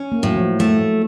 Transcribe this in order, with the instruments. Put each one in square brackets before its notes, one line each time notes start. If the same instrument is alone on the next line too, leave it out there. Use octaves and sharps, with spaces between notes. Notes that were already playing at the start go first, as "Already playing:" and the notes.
Already playing: [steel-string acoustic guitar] C#4
[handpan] A#3
[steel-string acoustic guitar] A2 [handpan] F#3
[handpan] F3
[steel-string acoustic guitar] A3